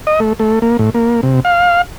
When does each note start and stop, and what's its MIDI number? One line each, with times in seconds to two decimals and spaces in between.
0.07 0.20 75
0.20 0.33 57
0.39 0.59 57
0.62 0.77 58
0.79 0.90 45
0.94 1.21 58
1.23 1.40 48
1.45 1.82 77